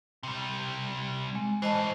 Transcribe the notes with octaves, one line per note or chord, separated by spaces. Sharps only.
C3 G3
G#3
A2 E3 C5 D#5 A5